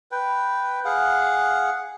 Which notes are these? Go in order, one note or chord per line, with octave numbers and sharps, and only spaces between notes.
B4 G5
G#4 F5 F#5